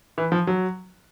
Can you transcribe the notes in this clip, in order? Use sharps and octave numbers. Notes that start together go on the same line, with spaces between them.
E3
F3
F#3